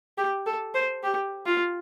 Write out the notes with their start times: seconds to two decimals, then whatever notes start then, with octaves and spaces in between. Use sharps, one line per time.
0.18 G4
0.46 A4
0.75 C5
1.03 G4
1.46 F4